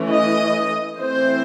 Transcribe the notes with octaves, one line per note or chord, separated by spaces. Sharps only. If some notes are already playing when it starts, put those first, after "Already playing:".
Already playing: E3 A3 C#4
D#5
E3 A3 C4 C5